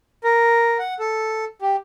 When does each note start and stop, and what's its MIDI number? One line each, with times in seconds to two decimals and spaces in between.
0.24 0.78 70
0.79 0.94 78
0.99 1.45 69
1.62 1.76 67